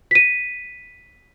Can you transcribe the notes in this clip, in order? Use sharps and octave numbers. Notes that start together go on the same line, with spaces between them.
B6 D#7